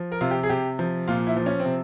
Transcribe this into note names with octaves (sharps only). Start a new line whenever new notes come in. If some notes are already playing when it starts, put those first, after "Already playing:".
Already playing: F3
A#4
C3 F4
G4
G#4
C3 G4
F3
A#2 F4
E4
F3
C#4
C4
C3